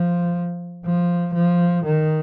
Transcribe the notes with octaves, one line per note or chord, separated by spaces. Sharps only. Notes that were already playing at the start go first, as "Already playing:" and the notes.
Already playing: F3
F3
F3
D#3